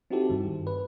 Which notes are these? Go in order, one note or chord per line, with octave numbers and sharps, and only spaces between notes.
C4 D#4 E4 F#4 G4 A4
G2 D#3
B4